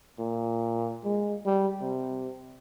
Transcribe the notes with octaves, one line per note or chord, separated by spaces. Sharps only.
A#2
G#3
G3
C3